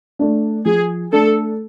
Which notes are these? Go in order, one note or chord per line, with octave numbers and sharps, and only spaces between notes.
A3 D4
F3 G#4
A3 D4 A4